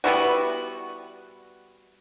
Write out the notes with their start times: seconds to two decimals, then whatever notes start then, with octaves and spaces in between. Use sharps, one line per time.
0.04 G3 B3 E4 F#4